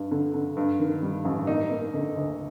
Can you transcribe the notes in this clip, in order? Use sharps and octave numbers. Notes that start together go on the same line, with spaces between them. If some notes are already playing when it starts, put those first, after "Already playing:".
Already playing: G2
D3
D3
G2
D#3
G3
A1
A#3 D#4
A#3
D3
D2